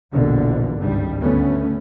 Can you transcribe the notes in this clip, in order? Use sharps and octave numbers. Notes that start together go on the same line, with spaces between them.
A#1 E2 B2 D3
G#1 C#2 G2 G3
D2 A3 B3 C#4